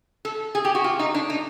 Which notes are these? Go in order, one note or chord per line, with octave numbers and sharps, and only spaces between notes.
A4
G#4
G4
F#4
F4
D#4
D4
D#4